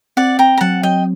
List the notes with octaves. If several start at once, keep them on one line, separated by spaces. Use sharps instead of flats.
C4 D5 F#5
C4 G5 A#5
A#5
F#3 F#5 A5
F#3 D#5 G5